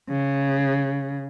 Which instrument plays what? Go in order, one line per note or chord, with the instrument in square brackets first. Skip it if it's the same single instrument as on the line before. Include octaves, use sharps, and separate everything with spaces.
[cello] C#3